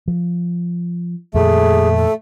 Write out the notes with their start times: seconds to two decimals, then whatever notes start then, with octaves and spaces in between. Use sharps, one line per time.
0.08 F3
1.34 F2 A#2 D#3 A3 G#4
1.95 A4